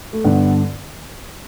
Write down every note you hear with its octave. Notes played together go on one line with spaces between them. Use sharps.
A3
G2 D3 B3